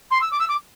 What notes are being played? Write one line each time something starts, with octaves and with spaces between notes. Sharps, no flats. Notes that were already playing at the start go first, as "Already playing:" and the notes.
C6
E6
D6
E6
D6